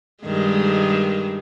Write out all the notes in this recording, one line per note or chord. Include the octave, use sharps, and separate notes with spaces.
G2 D#3 G#3